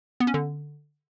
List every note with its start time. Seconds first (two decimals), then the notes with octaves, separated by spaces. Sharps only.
0.20 B3
0.27 C#4
0.34 D3